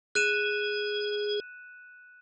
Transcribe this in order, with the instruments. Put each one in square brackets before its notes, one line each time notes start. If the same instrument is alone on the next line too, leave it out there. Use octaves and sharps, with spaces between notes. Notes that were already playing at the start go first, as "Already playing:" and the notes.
[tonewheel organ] G#4 [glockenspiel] F#6 D#7 E7